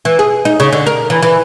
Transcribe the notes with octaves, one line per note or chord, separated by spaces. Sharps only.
E3
G#4
D#4
C#3
D3
A#4
E3
E3